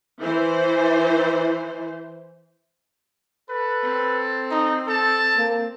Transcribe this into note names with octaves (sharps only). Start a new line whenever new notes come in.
E3 C5
A4 B4
C4
D#4
A4 D5 A5
A#3